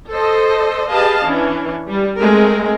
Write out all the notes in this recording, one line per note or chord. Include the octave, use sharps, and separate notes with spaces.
A4 C5 D#5
G4 G#4 B4 D#5 F5 A5
E3 C#4 D4
G3
G#3 A3 C4 A#4